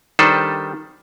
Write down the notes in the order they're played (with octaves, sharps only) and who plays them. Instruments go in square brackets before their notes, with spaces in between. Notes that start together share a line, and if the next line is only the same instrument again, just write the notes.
[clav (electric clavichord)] D#3 G3 D4 A4 B4 C5